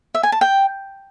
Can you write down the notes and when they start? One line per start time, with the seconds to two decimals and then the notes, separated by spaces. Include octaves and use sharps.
0.15 E5
0.23 G#5
0.32 A5
0.41 G5